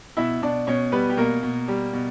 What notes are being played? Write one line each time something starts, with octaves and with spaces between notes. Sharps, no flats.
B2 E4 E5
B2 D4 D5
B2 C#4 C#5
G3 B3 B4
G4
B2 A#3 A#4
B2
G3
B2